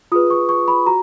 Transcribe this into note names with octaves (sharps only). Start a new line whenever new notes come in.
F4 G#4 B4 D#6
C#6
C#6
B5
F#4 A#5